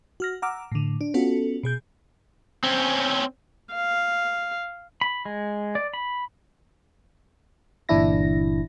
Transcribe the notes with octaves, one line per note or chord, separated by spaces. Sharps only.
F#4 F6 A#6
F#5 A#5 D6 E6 F6
A2 D3
D4
B3 C#4 F4 F#4 A4
B2 G#4 G6
C4 C#4
F5
B5
G#3
D5
B5
G1 A#2 E3 D4 E4 A#6